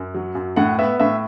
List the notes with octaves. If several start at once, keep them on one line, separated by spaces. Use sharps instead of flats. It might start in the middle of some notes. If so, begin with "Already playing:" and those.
Already playing: F#2
F#3
F#2
A2 F#5
B3 E5
A2 E5